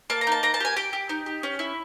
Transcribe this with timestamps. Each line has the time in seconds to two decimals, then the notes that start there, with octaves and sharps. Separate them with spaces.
0.10 A#3 A5
0.21 A#5
0.27 D#4 A5
0.43 A#3 A#5
0.54 A5
0.60 G4 G#5
0.77 G4 G5
0.93 G4
1.09 D#4
1.26 G4
1.43 C#4
1.59 E4